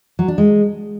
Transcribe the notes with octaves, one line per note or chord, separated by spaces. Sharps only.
F#3
D4
G#3